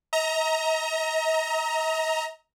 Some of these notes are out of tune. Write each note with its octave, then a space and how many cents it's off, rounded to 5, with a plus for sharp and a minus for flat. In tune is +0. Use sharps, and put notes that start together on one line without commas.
D#5 +45 A#5 +0